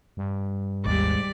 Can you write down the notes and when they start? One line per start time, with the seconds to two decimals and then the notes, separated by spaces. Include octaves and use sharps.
0.17 G2
0.85 G#1 D#2 G#2 G3 G4 D5